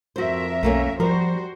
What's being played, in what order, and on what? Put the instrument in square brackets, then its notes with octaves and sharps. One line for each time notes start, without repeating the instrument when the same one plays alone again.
[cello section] F2 A#4 E5 [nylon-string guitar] F#4 C5
[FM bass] B1 [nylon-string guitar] A3 A#3 C#4
[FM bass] F3 [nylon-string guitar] G3 A#4 [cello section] F#4 C5